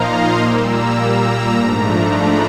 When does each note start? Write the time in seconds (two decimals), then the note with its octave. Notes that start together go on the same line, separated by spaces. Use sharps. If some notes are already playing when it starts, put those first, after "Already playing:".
Already playing: A#2 F3 A#3 D#4 F5 A#5 C6
0.10 D#6
0.38 A#2 G3 A#3 E6
0.67 A#5
0.97 A#5
1.53 G#2 F3 A3 D4
2.10 B5